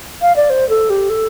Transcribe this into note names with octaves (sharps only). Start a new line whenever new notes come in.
F5
D5
C5
A4
G4
A4